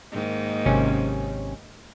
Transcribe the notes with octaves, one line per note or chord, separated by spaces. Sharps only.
G#2 D#3 A#3
G#1 C3 C#4